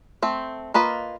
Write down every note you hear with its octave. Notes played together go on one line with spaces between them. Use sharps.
A3 C4
A#3 F4 B4 D#5